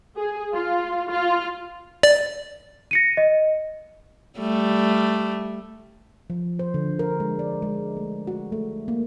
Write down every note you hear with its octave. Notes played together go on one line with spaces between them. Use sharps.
G#4
F4
F4
D5
A#6 C#7 D#7
D#5
G3 A3
F3
C5
D3
A#4
G#3
D5
G#3
A3
F#4
A3
A#3